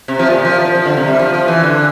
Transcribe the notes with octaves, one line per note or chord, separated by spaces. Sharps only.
C3
F3
A#2
F3
F3
F3
D3
C3
G3
F3
F3
E3
D3